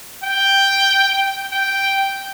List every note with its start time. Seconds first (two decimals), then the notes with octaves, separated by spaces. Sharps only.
0.24 G5
1.51 G5